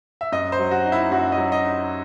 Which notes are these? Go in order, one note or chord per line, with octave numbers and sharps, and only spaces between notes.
E5
F#2 D#5
C5
F#3
F#4
D#4
E4
F#2 F#4
D#5
F#3
D#5
D#4